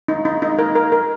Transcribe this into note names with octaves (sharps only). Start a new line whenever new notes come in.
D#4
D#4
D#4
A#4
A#4
A#4